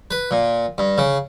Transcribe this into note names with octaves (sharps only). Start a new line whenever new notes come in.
B4
A#2
G2
C#3